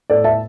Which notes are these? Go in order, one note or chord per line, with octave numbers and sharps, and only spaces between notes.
A2 A4 D5
E5 A5